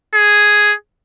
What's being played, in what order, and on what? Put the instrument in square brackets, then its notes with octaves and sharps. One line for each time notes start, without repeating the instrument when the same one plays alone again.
[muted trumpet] G#4